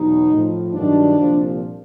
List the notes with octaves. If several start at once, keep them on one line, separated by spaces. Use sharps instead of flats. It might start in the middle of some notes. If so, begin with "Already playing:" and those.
Already playing: E2 B2 F#3 D#4
A2 F3
G2 D#3 F#3 D4
C2 A#2 F3